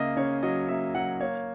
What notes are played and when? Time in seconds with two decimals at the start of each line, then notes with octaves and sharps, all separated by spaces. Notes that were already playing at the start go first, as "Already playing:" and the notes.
Already playing: C#3 A#3 D#5 E5
0.17 C#3 C#5
0.43 F#3 D#5
0.68 A#3 E5
0.95 F#3 F#5
1.20 A#3 C#5